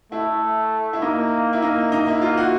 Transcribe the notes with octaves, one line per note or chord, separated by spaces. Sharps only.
A3 E4
E4
A#3 D#4
E4
A#3 D#4
A#3 D#4
E4
F4
F#4